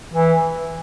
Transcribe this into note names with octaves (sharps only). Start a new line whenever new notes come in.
E3